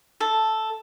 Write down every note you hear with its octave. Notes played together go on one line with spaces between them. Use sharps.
A4